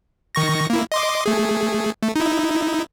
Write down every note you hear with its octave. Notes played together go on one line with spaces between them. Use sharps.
D#3 C#6 A#6
A#3 E4
D#5 C6 D6
A3 G#4
A3
D#4 E4